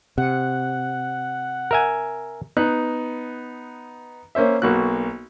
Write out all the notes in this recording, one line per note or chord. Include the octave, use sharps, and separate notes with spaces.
C3 F#5
A#4 E5 G#5
B3 D#4 F#6
A#3 C#4 C5 E5
B1 A#3 F#4 F#6